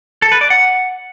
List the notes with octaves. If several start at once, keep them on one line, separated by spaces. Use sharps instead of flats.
A4
B4
D5
F#5